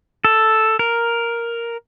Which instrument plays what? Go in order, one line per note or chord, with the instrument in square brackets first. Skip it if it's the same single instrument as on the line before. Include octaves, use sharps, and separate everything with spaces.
[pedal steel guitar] A4
A#4